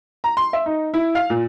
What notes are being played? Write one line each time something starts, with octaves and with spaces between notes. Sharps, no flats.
A#5
C6
E5
D#4
E4
F5
A#2